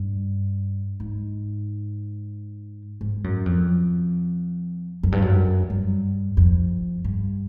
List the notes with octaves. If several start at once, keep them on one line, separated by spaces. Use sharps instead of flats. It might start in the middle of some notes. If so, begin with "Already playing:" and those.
Already playing: G2
G#2
G#2
F#2
F2
F#2
G2
F#2
G2
F2
G2